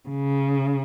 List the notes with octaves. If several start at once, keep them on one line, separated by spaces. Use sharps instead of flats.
C#3